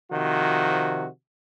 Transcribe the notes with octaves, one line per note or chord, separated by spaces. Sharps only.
C3 D#3 F3 F#4